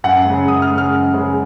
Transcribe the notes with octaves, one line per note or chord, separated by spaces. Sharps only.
F#2 F#5
C#3 G#3
F#2 D#6
F6
C#3 G#3
F6
F#2
C#3 G#3